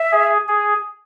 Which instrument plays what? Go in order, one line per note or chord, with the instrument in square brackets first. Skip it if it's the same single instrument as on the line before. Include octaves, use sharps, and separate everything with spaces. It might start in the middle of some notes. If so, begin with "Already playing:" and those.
Already playing: [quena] E5
[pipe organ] G#4
G#4